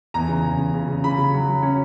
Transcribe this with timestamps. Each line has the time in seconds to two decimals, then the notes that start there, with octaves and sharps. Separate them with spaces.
0.14 E2 A#5
0.28 C#3
0.43 E2
0.58 C#3
0.74 C#3
0.88 C#3
1.04 C#3 B5
1.18 C#3
1.34 F#3
1.48 F#3
1.63 C#4